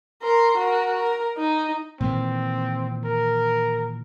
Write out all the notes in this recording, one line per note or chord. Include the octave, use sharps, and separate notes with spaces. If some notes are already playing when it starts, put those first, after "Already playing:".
A#4 C6
F#4 A#4
A#4
D#4
A#2 D#3 E3 C4
A#4